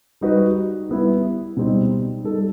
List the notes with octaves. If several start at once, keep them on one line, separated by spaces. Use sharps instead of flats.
G3 D#4 F#4 B4
G3 B3 E4
B2 G3 C4 D#4
G3 D#4 A4